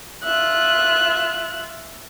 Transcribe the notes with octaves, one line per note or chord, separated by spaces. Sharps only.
F4 E5 F#6